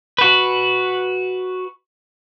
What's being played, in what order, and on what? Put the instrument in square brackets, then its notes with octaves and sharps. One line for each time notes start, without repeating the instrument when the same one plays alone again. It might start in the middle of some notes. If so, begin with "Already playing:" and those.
[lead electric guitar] F#4 B4